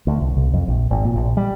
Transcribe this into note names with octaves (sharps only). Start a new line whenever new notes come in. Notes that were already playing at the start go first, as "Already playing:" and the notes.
D2
C2
C2
F2
A#1
G#1
A#2
A#1
G3